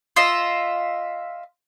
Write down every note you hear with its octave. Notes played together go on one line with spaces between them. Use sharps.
F4 D#5 E5